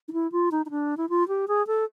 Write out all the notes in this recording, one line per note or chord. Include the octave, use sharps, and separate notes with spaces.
D#4
E4
F4
D#4
D#4
D4
E4
F4
G4
G#4
A4